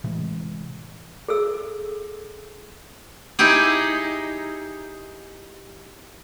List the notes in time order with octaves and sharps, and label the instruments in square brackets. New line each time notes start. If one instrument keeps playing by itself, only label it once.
[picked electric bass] A2 C3 E3 G#3
[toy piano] G#4 A4 E6
[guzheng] D#4 E4 G4 G#4